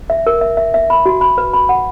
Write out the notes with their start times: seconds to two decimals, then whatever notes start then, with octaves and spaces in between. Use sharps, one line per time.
0.10 E5
0.27 A#4
0.41 E5
0.57 E5
0.74 E5
0.90 B5
1.06 F#4
1.21 B5
1.38 B4
1.53 B5
1.69 F#5